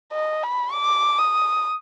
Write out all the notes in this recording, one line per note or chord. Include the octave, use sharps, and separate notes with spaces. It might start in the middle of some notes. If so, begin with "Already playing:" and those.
D#5
B5
D6
D#6